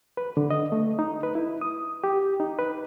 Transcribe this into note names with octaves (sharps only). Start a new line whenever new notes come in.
B4
D3
D#5
A3
D#4
B4
E4
D#6
G4
D#4
B4